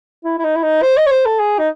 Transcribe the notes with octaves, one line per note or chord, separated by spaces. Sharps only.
E4
E4
D#4
E4
D#4
C5
D#5
C#5
C5
A4
G#4
D#4